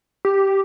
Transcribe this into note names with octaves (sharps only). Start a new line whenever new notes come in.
G4